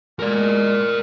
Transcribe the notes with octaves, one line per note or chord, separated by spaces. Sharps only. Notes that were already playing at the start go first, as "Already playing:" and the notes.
G#3 A#4 D5